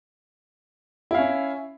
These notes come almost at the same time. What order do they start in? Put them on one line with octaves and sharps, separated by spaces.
E4 F5 C#4